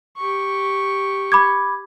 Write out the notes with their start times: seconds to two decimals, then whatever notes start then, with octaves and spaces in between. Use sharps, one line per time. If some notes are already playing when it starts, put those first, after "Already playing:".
0.17 G4 C#6
1.32 B5 D6 G#6